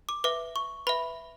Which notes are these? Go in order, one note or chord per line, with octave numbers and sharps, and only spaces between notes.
D6
B4 E5 D6
C#6
B4 E5 B5